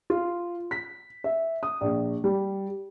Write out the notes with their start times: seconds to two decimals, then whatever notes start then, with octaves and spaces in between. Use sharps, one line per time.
0.10 F4
0.71 B6
1.24 E5
1.63 D#6
1.81 A#1
2.24 G3